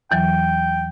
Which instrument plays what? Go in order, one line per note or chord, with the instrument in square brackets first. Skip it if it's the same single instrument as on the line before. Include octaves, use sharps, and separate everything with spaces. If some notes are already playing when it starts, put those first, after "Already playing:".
[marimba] E2 E3 F#3 [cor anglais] G5